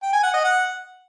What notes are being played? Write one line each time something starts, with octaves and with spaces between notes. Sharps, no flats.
G5
G#5
F#5
D#5
F#5